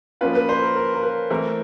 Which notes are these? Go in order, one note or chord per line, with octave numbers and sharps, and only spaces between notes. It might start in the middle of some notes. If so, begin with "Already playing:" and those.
F3 A#3 C#4 F4 B4
B4
C5
A#4
A#4
A#4
B4
E3 A3 C4 E4 A#4